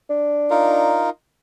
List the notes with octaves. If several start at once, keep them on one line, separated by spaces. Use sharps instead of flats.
D4
D#4 F4 A#4